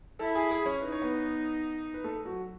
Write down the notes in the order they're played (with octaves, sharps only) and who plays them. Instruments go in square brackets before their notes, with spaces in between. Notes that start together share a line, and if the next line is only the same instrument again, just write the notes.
[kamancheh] E4 [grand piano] A4 A5
[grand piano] G#4 G#5
G#4 G#5
C#4 C#5
[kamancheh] D#4 [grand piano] B4
[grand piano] C#5
B3 B4
B4
A3 A4
F#3 F#4